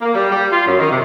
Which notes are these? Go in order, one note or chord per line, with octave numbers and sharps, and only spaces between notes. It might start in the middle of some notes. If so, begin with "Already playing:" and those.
A#3
G3
G3
F4
F#2
D#3
C3